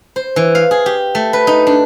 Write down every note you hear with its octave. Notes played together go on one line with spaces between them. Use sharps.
C5
E3
F5
G#4
G4
A3
B4
D#4
D4